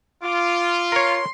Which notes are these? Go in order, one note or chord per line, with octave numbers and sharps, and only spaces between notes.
F4 D6
A#4 C#5 C6